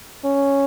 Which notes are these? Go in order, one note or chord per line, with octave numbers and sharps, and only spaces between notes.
C#4